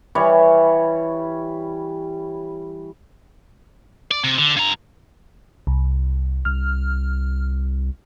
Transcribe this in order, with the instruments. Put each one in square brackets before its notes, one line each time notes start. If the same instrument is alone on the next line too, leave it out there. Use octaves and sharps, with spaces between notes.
[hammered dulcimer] E3 G3 C#5
[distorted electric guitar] D5
C3
D3
G2 A#5
[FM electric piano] C2
[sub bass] C2 [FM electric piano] F6